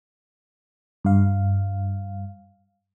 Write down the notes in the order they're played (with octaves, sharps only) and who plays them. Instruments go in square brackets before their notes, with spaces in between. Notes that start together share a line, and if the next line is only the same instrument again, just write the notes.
[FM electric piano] G2 F5